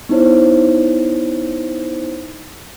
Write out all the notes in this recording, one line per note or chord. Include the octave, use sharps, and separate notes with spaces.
B3 D#4 E4 C5 C#5